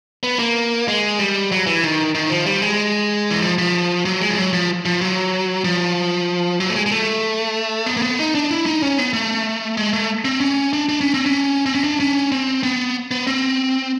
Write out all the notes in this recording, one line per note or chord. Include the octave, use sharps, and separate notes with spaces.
B3
A#3
G#3
G3
F#3
E3
D#3
D#3
F3
G3
G#3
E3
F3
F3
F#3
G#3
F3
F#3
F3
F3
F#3
F3
F#3
A3
G#3
G#3
A3
B3
A#3
B3
D#4
D4
E4
D#4
C#4
B3
A3
G#3
A3
C4
C#4
D4
D4
C#4
C4
C#4
C4
C#4
D4
C#4
C4
B3
B3
C4